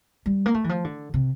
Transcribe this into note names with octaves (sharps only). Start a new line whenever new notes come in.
G3
A#3
A3
E3
F3
D3
C3